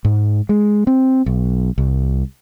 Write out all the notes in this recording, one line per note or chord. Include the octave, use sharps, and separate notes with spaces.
G#2
G#3
C4
B1
C2